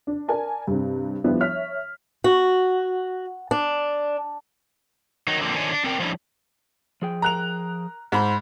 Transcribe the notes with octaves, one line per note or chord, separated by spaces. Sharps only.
D4
A#4 D5 G#5 A5
G2 C3
F3 G3 B3 D4 E4
C#5 E5 F6 B6
F#4
D4
D#3 F#3 D#4
D3 F3 F#3 A#3 C4
D3 D#3 F3 D4 C#5 G#5
D4
C4 D4 A#4 G5
F3 G3 C#4 D4 E4
F3 G#4 G5
A#4 A#5 F#6 F7
G#2 C5 B5 G6